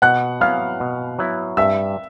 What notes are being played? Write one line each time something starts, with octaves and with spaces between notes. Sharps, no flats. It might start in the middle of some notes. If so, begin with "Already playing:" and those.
B2 F#5 F#6
F#3 B3 E4 F5 F6
B2
F#3 B3 E4
G2 E5 E6